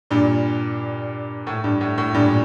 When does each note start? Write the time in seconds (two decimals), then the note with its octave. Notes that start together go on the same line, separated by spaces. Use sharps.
0.11 G2 A#2
1.47 A2
1.64 G2
1.81 A2
1.98 A2
2.14 G2 A#2